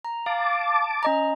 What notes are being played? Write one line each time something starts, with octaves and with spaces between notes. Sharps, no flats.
A#5
F5 A5 D6
C#4 D#5 A#5